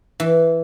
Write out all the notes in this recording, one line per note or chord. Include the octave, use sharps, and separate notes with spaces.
E3